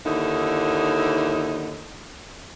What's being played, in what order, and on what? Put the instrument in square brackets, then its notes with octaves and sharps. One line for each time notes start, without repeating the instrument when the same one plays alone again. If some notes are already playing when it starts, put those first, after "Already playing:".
[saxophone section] D#2 D3 D#4 E4